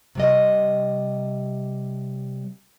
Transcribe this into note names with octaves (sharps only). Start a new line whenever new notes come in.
C3 G3 D#5